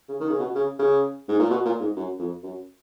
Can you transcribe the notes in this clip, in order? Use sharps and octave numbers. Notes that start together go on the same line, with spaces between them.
C#3
D#3
C#3
B2
C#3
C#3
G#2
A#2
B2
A#2
G#2
F#2
F2
F#2